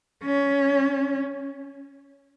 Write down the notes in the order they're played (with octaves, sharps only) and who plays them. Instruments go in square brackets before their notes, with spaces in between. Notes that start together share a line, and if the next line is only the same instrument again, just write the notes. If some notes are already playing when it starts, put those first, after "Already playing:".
[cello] C#4